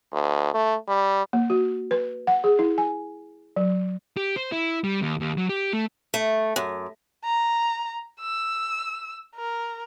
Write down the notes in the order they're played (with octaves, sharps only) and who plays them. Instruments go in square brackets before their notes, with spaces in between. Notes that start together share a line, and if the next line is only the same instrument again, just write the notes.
[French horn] D2
A3
G3
[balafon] A#3
F#4
B4
F#5
G#4
E4
G#5
F#3
[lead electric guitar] G4
C5
E4
G3
D#2
D#2
F#3
G4
A3
[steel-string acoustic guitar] A3
F#2
[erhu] A#5
E6
A#4